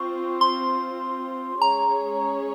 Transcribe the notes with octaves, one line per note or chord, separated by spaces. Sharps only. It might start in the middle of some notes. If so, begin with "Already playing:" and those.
Already playing: C4 F4 C5 C#6
C6
G#3 C#4 G#4 C#5 A#5